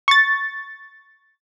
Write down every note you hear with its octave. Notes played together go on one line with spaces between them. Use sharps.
C#6 A6